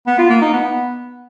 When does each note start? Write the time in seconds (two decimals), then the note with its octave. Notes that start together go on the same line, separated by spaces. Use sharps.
0.07 B3
0.18 F4
0.30 A#3
0.42 D#4
0.53 B3